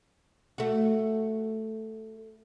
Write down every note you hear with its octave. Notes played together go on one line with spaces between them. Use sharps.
A3 F#4